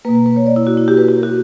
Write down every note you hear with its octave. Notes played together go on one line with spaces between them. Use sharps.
B2 A#3 B4
B4
B4
C#5
D5
E4
F#4
E4
G4
B4
G4
A#4
F#4